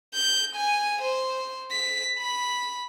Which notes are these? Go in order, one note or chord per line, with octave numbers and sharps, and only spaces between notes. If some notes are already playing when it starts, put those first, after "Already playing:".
G6
G#5
C5
B6
B5